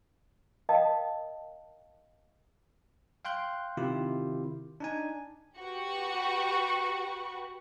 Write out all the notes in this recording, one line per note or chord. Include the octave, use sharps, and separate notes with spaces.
A#4 D#5 F5 G5 A5 D#6
F5 G5 C6 F#6 G6
C3 D#3 E4 F4 G4
D4 D#4 G#5
F#4 G4 B4 F#5 C#6